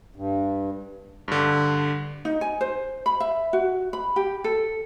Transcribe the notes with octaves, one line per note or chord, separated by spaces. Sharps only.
G2
G2 D3
D#4
G#5
C5
B5
E5
F#4
B5
G4
A4